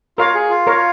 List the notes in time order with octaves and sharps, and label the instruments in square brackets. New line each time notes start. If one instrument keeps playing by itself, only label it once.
[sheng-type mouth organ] F4 [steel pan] A#4 C#5 F5
[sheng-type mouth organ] G#4
F4
[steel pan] A#4 C#5 F5